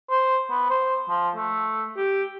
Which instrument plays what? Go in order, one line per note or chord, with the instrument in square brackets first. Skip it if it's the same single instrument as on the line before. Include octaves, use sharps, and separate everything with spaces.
[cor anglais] C5
B3
C5
F3
A3
G4